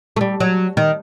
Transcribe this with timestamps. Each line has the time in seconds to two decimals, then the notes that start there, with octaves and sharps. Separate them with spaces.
0.16 A3
0.21 G3
0.40 F#3
0.77 D#3